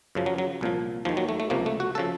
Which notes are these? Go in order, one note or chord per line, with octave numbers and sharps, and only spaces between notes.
F#2 C#3 F3
F#3
F#3
C2 A#2 F3
D#2 D#3 F3
F#3
A3
A3
C#2 C3 F3 A#3
A3
F#4
C#3 F3 A4